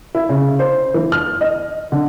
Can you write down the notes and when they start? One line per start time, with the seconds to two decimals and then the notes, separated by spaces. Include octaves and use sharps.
0.15 E4
0.29 C#3
0.59 C5
0.94 E3
1.12 F6
1.41 D#5
1.92 D3